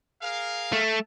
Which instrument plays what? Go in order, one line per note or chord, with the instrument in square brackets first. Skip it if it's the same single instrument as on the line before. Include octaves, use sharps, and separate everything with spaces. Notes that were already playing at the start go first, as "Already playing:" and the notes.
[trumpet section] G#4 A#4 F5
[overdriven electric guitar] A3